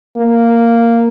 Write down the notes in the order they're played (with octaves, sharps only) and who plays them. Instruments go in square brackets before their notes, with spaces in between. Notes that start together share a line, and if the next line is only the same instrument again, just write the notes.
[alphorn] A#3